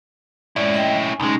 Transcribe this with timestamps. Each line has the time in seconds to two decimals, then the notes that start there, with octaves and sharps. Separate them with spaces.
0.56 G#3 C#4 E4 D5
0.74 D#5 G5
1.04 G#5
1.20 B1 G#3 C#4 D#4